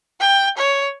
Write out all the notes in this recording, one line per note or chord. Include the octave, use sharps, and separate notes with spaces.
G5
C#5